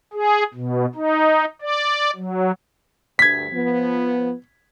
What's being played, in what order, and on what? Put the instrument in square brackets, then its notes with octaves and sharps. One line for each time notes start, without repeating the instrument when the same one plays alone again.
[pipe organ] G#4
B2
D#4
D5
F#3
[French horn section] D2 G2 [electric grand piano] G#6 B6
[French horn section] F3 B3